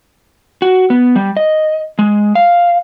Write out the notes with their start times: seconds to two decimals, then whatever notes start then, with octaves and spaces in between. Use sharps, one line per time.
0.62 F#4
0.90 B3
1.16 G3
1.37 D#5
1.99 G#3
2.35 F5